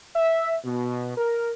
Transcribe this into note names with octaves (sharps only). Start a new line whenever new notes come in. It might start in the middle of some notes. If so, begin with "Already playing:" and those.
E5
B2
A#4